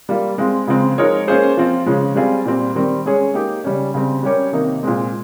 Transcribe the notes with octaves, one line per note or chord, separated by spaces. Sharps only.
G3 A#3 F4
G#3 C4 F4
C#3 F3 G#3 C4
F3 G#3 D#4 A#4 C#5
A#3 C#4 F4 G#4 C5
F3 C4 F4
C#3 F3 G#3 C#4
G3 C4 F4 G#4
A#2 G3 C4
D#3 G3 C4
G#3 C#4 G#4 C#5
A#3 D#4 G4
C#3 G3 C#4
C#3 G3 C4
G3 C#4 G4 A#4 C#5
C3 D#3 A#3 D#4
A#2 G#3 C4